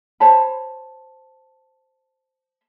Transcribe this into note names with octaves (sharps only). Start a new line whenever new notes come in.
C5 C#5 A5 B5